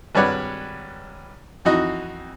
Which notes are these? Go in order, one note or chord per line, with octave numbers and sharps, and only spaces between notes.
G#1 G2 B4 C#5 D5 F#5
F2 E3 D#4 F#4 D#5